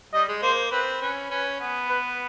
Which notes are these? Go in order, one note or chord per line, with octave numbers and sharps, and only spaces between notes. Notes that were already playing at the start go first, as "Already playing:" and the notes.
G3 D#5
G#3
A#3 C5
C4 B4
C#4 B4
C#4 B4
B3
B4